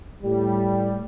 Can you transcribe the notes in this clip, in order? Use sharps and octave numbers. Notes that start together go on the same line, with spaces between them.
A2 G3